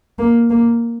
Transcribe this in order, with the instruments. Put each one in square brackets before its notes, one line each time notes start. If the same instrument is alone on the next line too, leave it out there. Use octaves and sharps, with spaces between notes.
[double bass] A#3
A#3